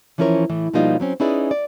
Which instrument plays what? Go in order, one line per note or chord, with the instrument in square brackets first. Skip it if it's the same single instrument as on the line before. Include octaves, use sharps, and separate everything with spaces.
[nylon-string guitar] E3 F3 C#4 E4 A#4 C#5
A2 E3
B2 F3 G3 A#3 D#4 F4
F#3 C4 C#4
C#4 D#4 E4 G#4 B4 D5
D5